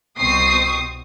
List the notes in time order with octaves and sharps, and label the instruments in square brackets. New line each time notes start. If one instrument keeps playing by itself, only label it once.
[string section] C2 B2 C4 C#6 D#6 C7